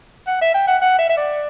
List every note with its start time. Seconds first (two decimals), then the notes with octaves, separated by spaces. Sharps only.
0.27 F#5
0.41 E5
0.54 G5
0.67 F#5
0.82 F#5
0.98 E5
1.09 E5
1.17 D5